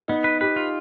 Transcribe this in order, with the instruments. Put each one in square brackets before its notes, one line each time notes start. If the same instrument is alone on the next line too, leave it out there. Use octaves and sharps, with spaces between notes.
[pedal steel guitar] B3 [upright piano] D#4
[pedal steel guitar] B4
[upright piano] G4 [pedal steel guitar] B4
[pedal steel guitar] F4